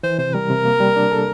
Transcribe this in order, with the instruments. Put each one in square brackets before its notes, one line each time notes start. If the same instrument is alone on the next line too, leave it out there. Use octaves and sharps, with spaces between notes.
[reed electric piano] E3 [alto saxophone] C5
[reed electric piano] C3 [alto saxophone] C5
[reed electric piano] G3 [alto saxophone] A#4
[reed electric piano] C3
A#3
G3
D4
A4